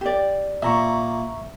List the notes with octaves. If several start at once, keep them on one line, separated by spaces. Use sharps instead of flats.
G4 D5
A#2 E5 A#5 C#6